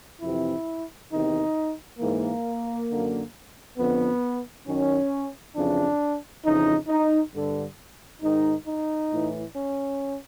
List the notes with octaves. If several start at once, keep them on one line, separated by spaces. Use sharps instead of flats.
F2 C3 E3 E4
E2 C3 D#3 D#4
G#2 E3 A#3
F#2 D3
F2 D3 B3
F#2 D#3 C#4
F2 C#3 E3 D4
F2 C#3 E3 D#4
D#4
G2 D3
G#2 D#3 D#4
D#4
A2 E3
C#4